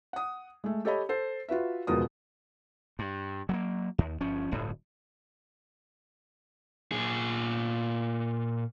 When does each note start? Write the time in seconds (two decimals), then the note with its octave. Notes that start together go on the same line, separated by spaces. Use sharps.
0.13 F#5 D#6
0.64 G#3 A3
0.85 G4 A4 C#5 D#5 B5
1.09 A4 C5
1.49 F4 F#4 B4 E5
1.87 E1 C#2 B2 F3 A#4 D#6
2.99 G2
3.49 F#3 G#3 A#3
3.98 D#2
4.21 G1 F3 C#4
4.51 D1 G1 D2 A2
6.92 A#2 G#4